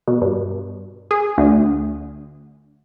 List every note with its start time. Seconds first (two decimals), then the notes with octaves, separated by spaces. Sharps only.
0.08 B2
0.22 G2
1.11 G#4
1.38 D2